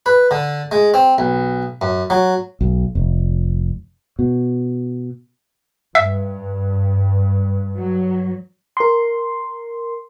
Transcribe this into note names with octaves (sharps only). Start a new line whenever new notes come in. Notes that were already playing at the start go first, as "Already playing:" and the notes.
B4
D3
G#3
C4
B1
F#2
F#3
B1
F1
B2
G2 E5
F#3
A#4 C6